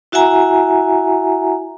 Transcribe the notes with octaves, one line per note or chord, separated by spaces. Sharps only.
E4 F#4 E5 F#5 G#5 A#5